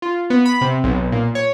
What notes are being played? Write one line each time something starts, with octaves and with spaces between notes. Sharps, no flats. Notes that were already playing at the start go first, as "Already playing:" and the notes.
F4
B3
B5
C3
B1
A#2
C#5